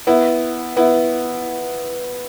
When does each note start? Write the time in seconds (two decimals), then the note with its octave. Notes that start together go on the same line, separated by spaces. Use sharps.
0.07 B3 E4
0.77 B3 E4